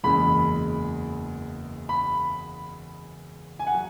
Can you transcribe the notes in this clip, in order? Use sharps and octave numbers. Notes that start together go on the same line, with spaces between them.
F#1 E2 C#3 G#3 B5
B5
G#5
F#5
F#3